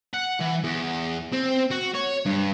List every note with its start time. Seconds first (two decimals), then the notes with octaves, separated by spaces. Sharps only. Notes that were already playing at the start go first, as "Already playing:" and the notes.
0.14 F#5
0.41 E3
0.64 E2
1.33 C4
1.71 F#4
1.94 C#5
2.26 G2